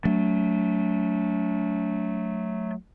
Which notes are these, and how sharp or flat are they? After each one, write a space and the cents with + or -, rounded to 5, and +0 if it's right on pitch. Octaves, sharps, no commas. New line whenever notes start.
F#3 +0 A3 +0 D4 -40